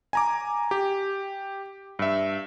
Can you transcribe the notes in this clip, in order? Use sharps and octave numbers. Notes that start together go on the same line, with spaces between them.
G#5 A#5 D6
G4
G2 E5